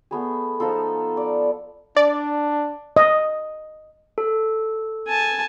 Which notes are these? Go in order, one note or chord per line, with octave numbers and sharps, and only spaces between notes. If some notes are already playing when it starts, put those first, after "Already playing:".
A3 B3 G#4
F3 D#4 F4 A4
D5
D4 D5
D#5
A4
G#5 A5